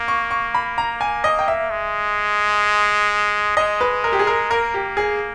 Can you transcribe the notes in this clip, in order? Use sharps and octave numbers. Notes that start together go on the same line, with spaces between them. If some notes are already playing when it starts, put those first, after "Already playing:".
Already playing: A#3
C#6
C#6
B5
A#5
G#5
D#5
G5
E5
G#3
G#3 D#5
B4
A#4
G4
G#4
A#4
A#3 A#4
G4
G#4